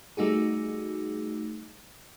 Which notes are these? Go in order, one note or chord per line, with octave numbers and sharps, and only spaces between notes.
G3 A3 D#4 F#4 G#4